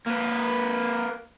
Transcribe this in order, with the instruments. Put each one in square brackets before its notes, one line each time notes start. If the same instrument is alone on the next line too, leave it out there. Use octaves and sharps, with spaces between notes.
[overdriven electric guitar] A#3 B4